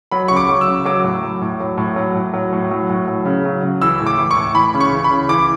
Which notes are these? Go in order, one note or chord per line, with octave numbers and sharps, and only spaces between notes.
F#3 B5
C#3 C#6
D6
F#3
E6
C#3
F#3 D6
A2
F#3
A2
F#3
A2
F#3
A2
F#3
A2
F#3
A2
F#3
C#3
F#3
C#3
E3 E6
A2
D6
E3
C#6
A2
E3 B5
C#3
C#6
E3
B5
C#3
E3 D6